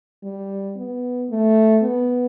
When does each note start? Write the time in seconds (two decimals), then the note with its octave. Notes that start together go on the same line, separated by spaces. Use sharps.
0.23 G3
0.76 B3
1.30 A3
1.83 B3